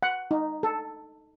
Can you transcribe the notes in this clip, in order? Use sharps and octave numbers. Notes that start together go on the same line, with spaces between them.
F#5
D#4
A4